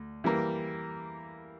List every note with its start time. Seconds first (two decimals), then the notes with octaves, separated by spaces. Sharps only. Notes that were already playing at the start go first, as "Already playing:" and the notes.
Already playing: D2
0.24 E3 G3 A#3